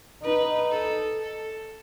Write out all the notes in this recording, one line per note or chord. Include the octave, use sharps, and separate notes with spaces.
D#4 B4
A4
A4